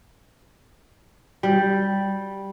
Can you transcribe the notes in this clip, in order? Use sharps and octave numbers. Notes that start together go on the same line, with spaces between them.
G3